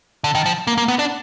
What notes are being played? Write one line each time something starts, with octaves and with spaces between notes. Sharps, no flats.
D3
D#3
F3
A#3
A#3
B3
D4